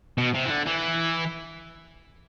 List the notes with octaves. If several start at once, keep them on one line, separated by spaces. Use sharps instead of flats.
B2
C3
E3
D3
E3